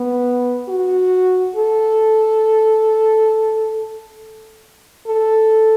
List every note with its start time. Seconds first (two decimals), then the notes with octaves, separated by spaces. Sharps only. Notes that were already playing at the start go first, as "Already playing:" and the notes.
Already playing: B3
0.68 F#4
1.56 A4
5.07 A4